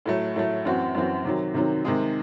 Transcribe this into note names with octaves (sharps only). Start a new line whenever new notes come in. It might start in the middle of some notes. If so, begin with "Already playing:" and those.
A2 F#3 A3
A2 F#3 A3
F#2 E3 C4 F#4
F#2 E3 C4 F#4
C3 D#3 F#3
C3 D#3 F#3
C3 D#3 G#3 D#4